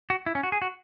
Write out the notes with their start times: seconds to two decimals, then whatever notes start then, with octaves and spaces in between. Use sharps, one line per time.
0.10 F#4
0.26 E4
0.35 C#4
0.43 F#4
0.52 G#4
0.62 F#4